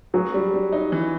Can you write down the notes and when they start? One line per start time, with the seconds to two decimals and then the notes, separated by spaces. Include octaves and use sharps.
0.14 F#3 G#4
0.34 G3
0.54 G3
0.72 D#4
0.92 E3